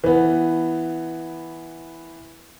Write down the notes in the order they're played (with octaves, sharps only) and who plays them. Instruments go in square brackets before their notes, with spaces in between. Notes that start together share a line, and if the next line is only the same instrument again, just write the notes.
[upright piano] E3 B3